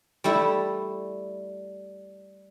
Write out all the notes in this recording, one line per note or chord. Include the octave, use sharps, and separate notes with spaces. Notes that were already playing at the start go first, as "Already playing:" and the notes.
G3 A3 E4